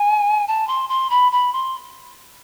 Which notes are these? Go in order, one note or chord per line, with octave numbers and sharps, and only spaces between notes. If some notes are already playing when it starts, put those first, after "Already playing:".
Already playing: G#5
A5
C6
C6
B5
B5
C6